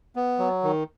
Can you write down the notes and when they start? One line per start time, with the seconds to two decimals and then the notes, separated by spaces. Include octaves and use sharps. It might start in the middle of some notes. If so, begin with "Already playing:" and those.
0.16 B3
0.39 F#3
0.63 D#3